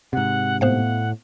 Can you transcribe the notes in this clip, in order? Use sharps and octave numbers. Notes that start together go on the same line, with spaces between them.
G#2 C3 F#5
A2 B3 C5 F5 F#5